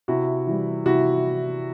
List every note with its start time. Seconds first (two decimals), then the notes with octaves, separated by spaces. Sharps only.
0.08 C3 E4 F#4
0.47 E3 G3
0.86 C3 E4 F#4